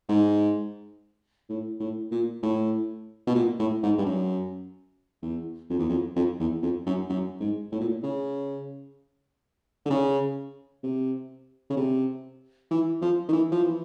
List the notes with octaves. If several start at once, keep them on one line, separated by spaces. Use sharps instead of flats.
G#2
A2
A2
A#2
A2
B2
A#2
A2
G#2
G2
F#2
E2
F2
E2
F2
F2
E2
F2
F#2
F#2
G#2
A2
A#2
A2
C#3
D3
C#3
C3
C#3
C3
E3
F3
D#3
E3
F3
E3